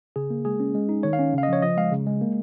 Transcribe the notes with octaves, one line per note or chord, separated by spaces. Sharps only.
C#3 G#4
A#3
G#3 G#4
C#4
G#3
D#4
D#3 C#5
F5
C#4
C#3 F5
D#5
F3 C#5
F3 D#5
G#3 F5
C#3
G#3
A#3